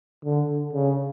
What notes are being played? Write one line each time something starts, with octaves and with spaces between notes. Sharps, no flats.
D3
C#3